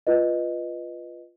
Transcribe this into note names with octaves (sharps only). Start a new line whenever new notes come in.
F4 B4 D#5